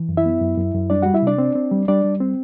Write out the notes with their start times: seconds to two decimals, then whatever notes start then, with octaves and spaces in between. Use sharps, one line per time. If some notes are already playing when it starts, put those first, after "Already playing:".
Already playing: E3
0.09 F#2
0.17 E4 E5
0.25 B3
0.41 F#2
0.58 F#2
0.74 F#2
0.90 G3 D4 D5
1.02 G3 F#4 F#5
1.14 E4 E5
1.22 C3 D4 D5
1.38 C4
1.55 C4
1.72 G3
1.88 G3 D4 D5
2.04 G3
2.20 C4